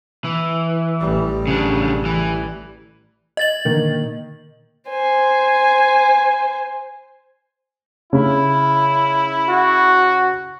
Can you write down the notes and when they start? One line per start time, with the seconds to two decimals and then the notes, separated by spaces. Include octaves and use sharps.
0.24 E3
1.00 A1 G3
1.47 C#3 D4
2.05 E3
3.37 D#5 A6 F#7
3.65 A#2 D3 D#3 A#3
4.89 C5 G#5
8.13 C#3 E4
9.50 F#4